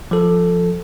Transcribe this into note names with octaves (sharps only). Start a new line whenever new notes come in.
F3 A4